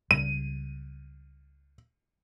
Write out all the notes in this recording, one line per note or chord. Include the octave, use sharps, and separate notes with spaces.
C#2 C#3 G3 D#7